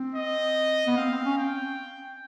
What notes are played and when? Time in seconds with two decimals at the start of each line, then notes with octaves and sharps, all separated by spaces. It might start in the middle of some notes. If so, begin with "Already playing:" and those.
Already playing: C4
0.15 D#5
0.87 B3
0.97 C4 F5
1.11 C4
1.25 C#4
1.38 G5